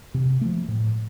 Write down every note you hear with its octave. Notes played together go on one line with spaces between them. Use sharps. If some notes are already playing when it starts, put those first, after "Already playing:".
C3
F3 A3
A2